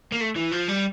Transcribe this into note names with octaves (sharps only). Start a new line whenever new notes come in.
A#3
A3
E3
F3
G3